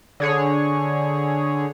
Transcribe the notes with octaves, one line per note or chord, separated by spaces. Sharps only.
D3 G#4 C#5